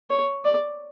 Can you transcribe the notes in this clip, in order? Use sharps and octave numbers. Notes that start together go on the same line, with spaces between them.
C#5
D5